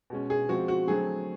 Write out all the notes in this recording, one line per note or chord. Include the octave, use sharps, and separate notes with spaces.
B2 G#3 C#4
G#4
F3 G#3 C4 F#4
F#4
D3 F#3 A3 C4 G#4